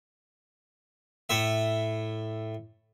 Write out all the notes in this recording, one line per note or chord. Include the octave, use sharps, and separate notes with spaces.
A2 E5